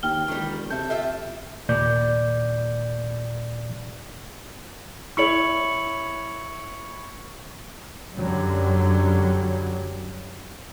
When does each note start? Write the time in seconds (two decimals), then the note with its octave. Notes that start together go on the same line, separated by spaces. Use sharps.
0.03 D#2 G5 F6 G7
0.28 E1 D#3 G3
0.70 C3 A4 E5 G6
0.90 F4 G4 E5
1.69 D#2 A#2 D5 G6
5.17 E4 C#5 C#6 C#7 F#7
8.15 F#2 D3 F#3 G3